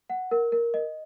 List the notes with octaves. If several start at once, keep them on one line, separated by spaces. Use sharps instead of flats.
F#5
A#4
A#4
D#5